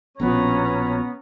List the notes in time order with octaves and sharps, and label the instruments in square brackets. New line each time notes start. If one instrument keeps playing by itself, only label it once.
[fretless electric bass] A#1 B2 F3 [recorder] B3 [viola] C#4 A#5